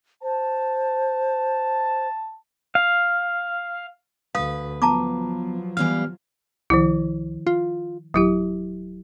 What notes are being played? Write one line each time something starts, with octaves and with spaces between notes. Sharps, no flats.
C5 A5
F5
D2 B4 F5 D#6
F3 F#3 B3 A5 A#5 D6
E3 G3 B3 F5 F6
C2 D#3 F3 E4
F4
D#1 F#3 E4 G4